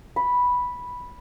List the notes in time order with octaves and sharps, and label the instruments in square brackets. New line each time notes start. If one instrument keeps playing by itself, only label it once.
[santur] B5